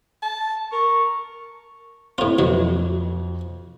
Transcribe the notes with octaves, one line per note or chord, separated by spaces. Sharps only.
A5
A#4 C#6
A2 C4 E4 F4
F2 B2 F#3